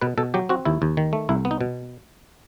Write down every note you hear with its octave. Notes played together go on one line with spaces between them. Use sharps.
B2 B4
B2 A4
F#3 G4
C4 F#4
D#2 E4
D#2
D#3
A3
C2 E4
B3
D#4
B2